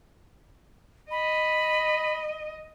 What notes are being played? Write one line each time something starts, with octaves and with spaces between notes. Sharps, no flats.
D#5 B5